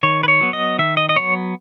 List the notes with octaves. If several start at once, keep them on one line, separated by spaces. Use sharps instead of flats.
D#3 C#5
B4
C#5
F#3 B3
D#5
D#3 E5
D#5
D#5
F#3 B3 C#5